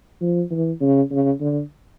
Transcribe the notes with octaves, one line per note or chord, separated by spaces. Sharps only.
F3
E3
C#3
C#3
D3